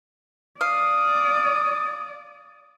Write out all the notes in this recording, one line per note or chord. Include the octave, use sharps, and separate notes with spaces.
D5 F5 D#6